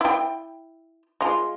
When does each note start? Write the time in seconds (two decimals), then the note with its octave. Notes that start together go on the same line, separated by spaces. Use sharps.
0.01 E4 G5
1.21 G#3 F4